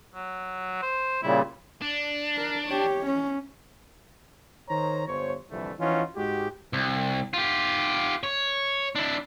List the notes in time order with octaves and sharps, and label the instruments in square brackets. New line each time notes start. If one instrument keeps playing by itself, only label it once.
[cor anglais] F#3
C5
[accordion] A#2 C#3 G3 [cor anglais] E4
[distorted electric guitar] D4
[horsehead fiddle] A#4
G4 C#5
C#4
[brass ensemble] D#3 C5 C#5 A#5
G1 C5 C#5
C2 F2 D3 E3 F3 A3
E3 F3 C#4 D#4 F4 F#4
G#2 G#3 F#4 G4
[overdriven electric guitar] C2
F4 G4
C#5
D4 E4